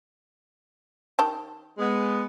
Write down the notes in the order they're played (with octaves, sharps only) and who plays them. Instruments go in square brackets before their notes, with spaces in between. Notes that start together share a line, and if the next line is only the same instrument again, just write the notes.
[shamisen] D#3 G4 A5
[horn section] G#3 B3